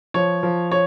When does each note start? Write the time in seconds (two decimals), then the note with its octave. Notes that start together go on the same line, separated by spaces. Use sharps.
0.14 F3 C#5
0.43 F3
0.71 C#5